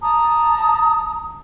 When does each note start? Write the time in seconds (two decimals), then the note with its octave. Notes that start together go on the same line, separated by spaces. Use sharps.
0.01 A5 A#5 D#6